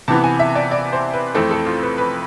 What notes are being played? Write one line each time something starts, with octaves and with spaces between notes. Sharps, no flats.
C3 E3 B3 A5
G#5
E5
D5
D5
C5
B4
F2 E3 A3 C4 A4
A4
F4
B4
B4